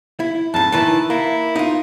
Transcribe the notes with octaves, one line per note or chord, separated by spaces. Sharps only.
E4
F2 G#2 A5
D#3 E3 E4 A5
A#3 E4
D#4 F4